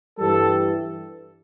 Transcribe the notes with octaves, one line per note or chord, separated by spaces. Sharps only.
G2 E3 G3 A4